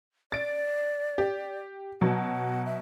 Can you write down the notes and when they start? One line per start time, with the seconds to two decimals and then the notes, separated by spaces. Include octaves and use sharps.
0.32 D5 A6 D7
1.18 G4
2.01 B2 F#3 F#5
2.66 E5